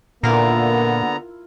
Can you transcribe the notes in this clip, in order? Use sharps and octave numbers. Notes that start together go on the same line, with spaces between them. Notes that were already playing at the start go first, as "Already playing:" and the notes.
A#2 D3 A#3 B3 E4 F4 A#4 A#5